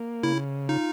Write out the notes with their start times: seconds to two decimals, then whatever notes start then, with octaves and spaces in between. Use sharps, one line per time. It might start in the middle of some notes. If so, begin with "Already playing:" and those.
Already playing: A#3
0.23 C#3 E4
0.69 D#4 F4